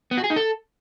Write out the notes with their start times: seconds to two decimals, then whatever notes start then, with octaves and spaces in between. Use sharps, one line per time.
0.11 B3
0.18 F#4
0.24 G#4
0.30 D#4
0.36 A4